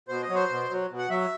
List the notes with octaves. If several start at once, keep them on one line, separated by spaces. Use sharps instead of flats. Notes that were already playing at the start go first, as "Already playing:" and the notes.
B2 C5
D#5
F#3
C5
B2
F#3
B2
F#5
F#3 E5